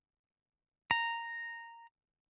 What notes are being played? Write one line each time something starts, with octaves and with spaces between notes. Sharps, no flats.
A#5